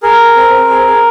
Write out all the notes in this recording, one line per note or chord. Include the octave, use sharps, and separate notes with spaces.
G#4 A#4
G#4
C4
C4
G#4
G#4